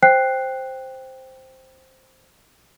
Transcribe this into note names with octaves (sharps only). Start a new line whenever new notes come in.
C5 G5 F#6 C7